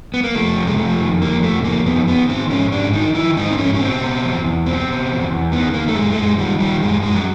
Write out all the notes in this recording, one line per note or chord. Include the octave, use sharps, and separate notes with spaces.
B3
A#3
F2 A3
C3
G#3
F2 A3
D#3
F2 A#3
C3 A3
F2 A#3
D#3 B3
D#3 B3
D#3 C4
G#2 C#4
G#2 D4
D#3 D#4
D#3 E4
G#2 D#4
C4
G#2 C#4
C#4
B2 C4
B2
E2
E2
B2 C4
B2
E2
E2
D#3 B3
D#3 A#3
A3
F#2 G#3
A3
F#2 G#3
D#3 G3
D#3 G3
F#2 G#3
F#2 G#3
F#3